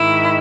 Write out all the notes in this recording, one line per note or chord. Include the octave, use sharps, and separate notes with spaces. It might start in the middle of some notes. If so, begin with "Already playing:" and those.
Already playing: G#2 D#3 E4